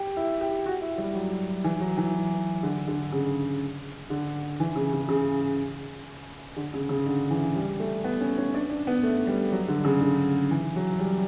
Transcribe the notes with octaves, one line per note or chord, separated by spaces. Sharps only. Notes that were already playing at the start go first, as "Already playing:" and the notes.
Already playing: G4
E4
G4
F#4
E4
G3
F#3
E3
F#3
E3
D3
D3
C#3
D3
E3
C#3
C#3
C#3
D3
C#3
C#3
D3
E3
G3
A3
B3
C#4
C#4
D4
D4
B3
A3
G3
F#3
D3
C#3
D3
E3
F#3
G3